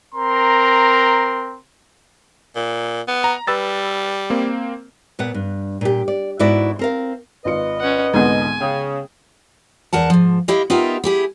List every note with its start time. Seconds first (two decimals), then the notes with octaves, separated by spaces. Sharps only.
0.15 C4 A#4 A#5 C6
2.56 A#2
3.08 B3
3.24 A#5
3.47 G3 B4 E6 A6
4.30 A#3 C4
5.19 A#2 B3 F#5
5.34 G2
5.81 A#2 G4
6.08 D5
6.39 G#2 B3 E4 F#4 D5
6.79 C4 A#4 F5
7.45 G#1 F4 B4 D#5 C#7
7.80 C#4 F#5
8.14 C2 G#2 D3 G#3 B3 G#5
8.60 C#3 G5 D#6
9.93 E2 A#4 F#5 A5
10.10 G#2 F3
10.48 E4 G4 D#5 F5
10.70 B3 D#4 F4 G4 A#4 E5
11.04 E4 G4 G#4